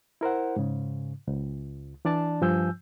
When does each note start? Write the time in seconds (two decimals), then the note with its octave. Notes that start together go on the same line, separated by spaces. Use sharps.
0.21 E4 A#4 C5 F#5
0.56 G#2 C#3
1.28 C#2
2.05 E3 D4 D5 A5
2.41 G2 F3 G#5 E6 G6